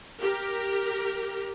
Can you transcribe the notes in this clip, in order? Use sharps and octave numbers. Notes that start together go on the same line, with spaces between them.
G4 A#4